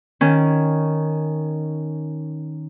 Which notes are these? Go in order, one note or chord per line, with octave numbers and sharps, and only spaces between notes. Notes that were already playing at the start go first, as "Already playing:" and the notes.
D#3 C#4